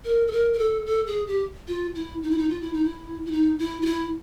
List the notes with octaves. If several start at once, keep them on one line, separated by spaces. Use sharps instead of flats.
A#4
A4
A#4
A#4
A4
A4
G#4
G4
F4
E4
D#4
E4
D#4
F4
E4
D#4
E4
E4
D#4
E4
F4
E4